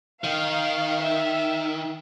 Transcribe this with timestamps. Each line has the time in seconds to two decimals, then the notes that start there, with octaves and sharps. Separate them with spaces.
0.23 D#3 F5
0.99 E5